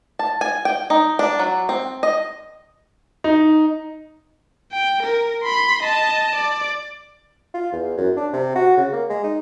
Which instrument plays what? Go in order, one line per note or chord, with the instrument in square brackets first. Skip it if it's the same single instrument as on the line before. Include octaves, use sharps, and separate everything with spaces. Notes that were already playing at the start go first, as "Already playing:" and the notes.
[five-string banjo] A5
G#5
G5
D#4
D4
F#3
C4
D#5
[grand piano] D#4
[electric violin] G5
A#4
B5 C6
D#5 A5
D5
[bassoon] F4
E2
F#2
D4
C3
F#4
C#3
A#3
G#3
D#4